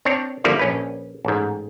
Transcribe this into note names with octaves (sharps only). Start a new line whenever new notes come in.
C4 D4 C#5
D3 F3 G3 A#3 E4
A#1 C#4 B4
A1 G#2